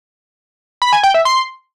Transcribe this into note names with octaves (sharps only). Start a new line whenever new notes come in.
B5
G#5
G5
E5
C6